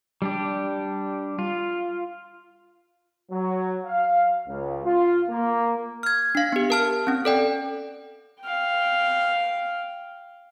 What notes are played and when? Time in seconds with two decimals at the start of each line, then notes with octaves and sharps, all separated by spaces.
0.22 G3 D4 G4
1.39 F4
3.31 F#3
3.86 F5
4.48 C#2
4.85 F4
5.30 A#3
6.03 F6 G#6
6.35 D4 F5
6.53 B3 G4
6.70 A#4 A5 F6
7.07 C4 C#4
7.25 A4 D5 G5
8.42 F5 G5